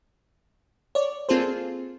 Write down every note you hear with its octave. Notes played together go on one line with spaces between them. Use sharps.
C#5 D5
A#3 C4 F4 G#4 A4 C5